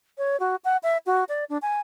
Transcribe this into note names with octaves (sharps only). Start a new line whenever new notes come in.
C#5
F#4
F#5
E5
F#4
D5
D4
G#5